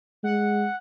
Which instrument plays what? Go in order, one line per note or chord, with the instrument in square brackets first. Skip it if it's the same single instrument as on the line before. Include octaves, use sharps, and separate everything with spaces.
[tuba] G#3 [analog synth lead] F#5